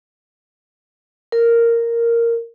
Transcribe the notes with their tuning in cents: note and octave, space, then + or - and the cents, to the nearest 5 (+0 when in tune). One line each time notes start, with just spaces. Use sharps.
A#4 -5